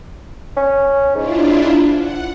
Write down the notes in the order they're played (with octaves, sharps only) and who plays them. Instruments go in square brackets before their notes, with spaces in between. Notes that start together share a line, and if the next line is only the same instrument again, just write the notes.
[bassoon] C#4
[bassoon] G#2 [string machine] D4 E4 F4
[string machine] F#5